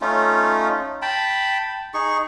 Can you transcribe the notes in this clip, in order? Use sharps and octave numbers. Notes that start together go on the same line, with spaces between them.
A3 C#4 D#4 F4
G5 A5 B5
D#4 G#4 C#6